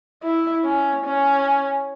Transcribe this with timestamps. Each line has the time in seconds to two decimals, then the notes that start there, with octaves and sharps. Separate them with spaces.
0.23 E4
0.65 C#4
1.05 C#4